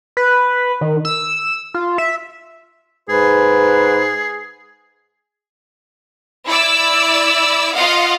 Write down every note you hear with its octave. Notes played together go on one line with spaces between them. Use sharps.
B4
D#3
E6
F4
E5
G#2 G#4 B4
E4 D5 E6
F4 D#5 F5 F#5